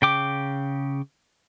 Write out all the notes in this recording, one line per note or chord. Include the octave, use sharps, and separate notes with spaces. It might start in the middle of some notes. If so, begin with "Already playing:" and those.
C#3 G5 D6